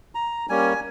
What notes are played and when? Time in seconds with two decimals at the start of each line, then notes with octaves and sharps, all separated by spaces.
0.15 A#5
0.49 G3 A#3 C#4 G#5